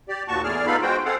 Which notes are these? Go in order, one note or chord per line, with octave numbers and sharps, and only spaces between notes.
G4 D5
D#2 A#2 F#4 A5 C#6
E2 A2 G#4 D5 F6
B3 D#4 F4 A4 F5 B5
G#3 F#4 C5 G5
C4 G#4 A4 F5 F#5